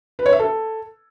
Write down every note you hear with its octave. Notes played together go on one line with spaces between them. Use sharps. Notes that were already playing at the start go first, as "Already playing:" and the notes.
B4
C#5
E5
A4